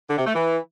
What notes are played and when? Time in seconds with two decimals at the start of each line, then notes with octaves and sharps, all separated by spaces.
0.09 D3
0.17 C3
0.26 A3
0.34 E3